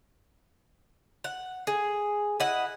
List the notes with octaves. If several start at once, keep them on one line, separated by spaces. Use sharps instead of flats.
F#5
G#4
E4 D#5 F#5